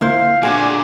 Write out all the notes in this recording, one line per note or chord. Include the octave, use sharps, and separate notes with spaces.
A1 D2 A#3 E4 F4 C5 F5
A#2 D3 D4 F#4 G#4 G#5